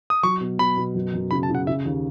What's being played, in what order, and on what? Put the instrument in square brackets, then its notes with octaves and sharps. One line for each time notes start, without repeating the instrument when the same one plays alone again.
[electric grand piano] D#6
[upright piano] F#3 [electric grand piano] C#6
[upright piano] B2
[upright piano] B2 [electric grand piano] B5
[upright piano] B2
F#2
F#2
[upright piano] C#3 [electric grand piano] B5
[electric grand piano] A5
[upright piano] C#3 [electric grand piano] F#5
[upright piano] C#3 [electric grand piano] E5
[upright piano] D#2